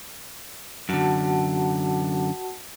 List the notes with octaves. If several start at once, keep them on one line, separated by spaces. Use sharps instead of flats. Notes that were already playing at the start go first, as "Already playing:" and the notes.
F#2 D3 F#4 F#5 A5